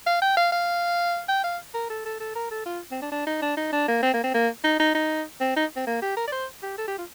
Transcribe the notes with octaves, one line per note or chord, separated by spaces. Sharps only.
F5
G5
F5
F5
G5
F5
A#4
A4
A4
A4
A#4
A4
F4
C4
D4
D4
D#4
D4
D#4
D4
A#3
C4
A#3
C4
A#3
D#4
D#4
D#4
C4
D#4
C4
A#3
G4
A#4
D5
C5
G4
A4
G4
F4